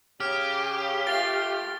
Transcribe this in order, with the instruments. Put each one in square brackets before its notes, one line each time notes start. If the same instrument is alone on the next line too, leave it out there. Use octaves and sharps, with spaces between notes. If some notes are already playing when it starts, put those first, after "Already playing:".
[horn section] C#3 [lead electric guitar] G4 [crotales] F6
[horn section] A3 A#3 F4 [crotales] A6 G7